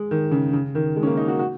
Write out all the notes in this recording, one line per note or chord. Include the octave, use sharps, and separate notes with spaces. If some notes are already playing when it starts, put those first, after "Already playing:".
Already playing: G#3
D#3
C#3
C#3
D#3
G#3
C#4
A#3
D#4
F#4
F#4